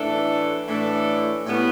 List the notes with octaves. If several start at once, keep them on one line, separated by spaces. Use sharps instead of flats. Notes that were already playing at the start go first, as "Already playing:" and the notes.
Already playing: A2 E3 A3 D4 A4
A2 E3 A3 D4 A4
A2 G3 B3